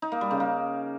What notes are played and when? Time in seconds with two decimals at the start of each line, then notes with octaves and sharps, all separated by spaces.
0.02 D#4
0.12 A#3
0.21 G3
0.31 C#3
0.40 A#3